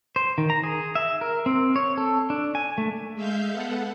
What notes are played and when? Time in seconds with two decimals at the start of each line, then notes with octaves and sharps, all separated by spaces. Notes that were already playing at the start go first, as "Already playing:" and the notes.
0.16 C5
0.38 D#3
0.50 A#5
0.63 G#4
0.95 E5
1.21 A#4
1.46 C4
1.76 C#5
1.97 A4
2.30 D4
2.55 G#5
2.78 A3
3.14 G#3 E5 F5 G6
3.51 B3 A4 F#5